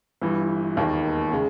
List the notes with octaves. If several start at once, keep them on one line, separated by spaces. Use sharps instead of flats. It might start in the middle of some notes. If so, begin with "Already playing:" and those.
G1 G2 E3
E1 D#2 D#3 A#3
C#3 G#3